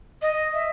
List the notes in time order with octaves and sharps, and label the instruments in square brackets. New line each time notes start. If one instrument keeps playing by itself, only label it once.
[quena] D#5
E5